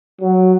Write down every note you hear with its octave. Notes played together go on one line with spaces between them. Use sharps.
F#3